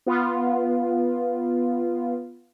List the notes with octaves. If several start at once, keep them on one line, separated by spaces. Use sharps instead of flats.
B3 F4